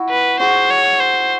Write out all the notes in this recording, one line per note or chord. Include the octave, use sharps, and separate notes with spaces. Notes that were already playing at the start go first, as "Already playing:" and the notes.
Already playing: E4 F#4
B4
F#4 G#4 C5
C#5
C5